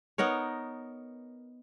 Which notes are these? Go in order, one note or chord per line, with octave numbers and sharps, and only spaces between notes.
B3 D#4 A#4 C#5